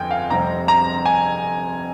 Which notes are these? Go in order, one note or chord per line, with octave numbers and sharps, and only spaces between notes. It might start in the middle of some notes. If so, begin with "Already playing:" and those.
Already playing: G1 F2 G5 G#5
F5
F1 F2 C3 G3 C4 A#5
A#5
G#5